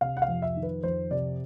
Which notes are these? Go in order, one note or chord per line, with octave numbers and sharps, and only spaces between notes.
C3 F5
F#5
F5
F2
E5
D#3
B4
F2 C5
C3 D5